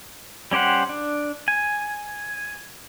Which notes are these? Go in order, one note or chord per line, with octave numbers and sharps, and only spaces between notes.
G3 C#4 G4 C5 F#5
D4
G#5